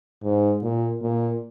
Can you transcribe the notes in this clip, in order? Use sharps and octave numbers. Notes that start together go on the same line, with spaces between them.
G#2
A#2
A#2